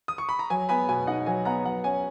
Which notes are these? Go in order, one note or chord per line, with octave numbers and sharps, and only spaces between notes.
D#6
C#6
B5
A#5
F#3 G#5
B3 G#5 B5
B2 G#5
D#4 F#5
F#3 G#5
B3 F#5 A#5
F#3 F#5
C#4 G#5